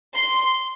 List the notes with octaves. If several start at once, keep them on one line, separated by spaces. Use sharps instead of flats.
C6